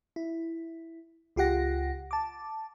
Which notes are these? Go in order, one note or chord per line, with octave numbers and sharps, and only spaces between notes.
E4
C#2 F4 G4 F#5 A#6
A5 D6